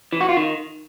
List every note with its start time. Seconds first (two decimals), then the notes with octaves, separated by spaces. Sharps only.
0.13 E3
0.21 F#4
0.29 F4
0.37 D#3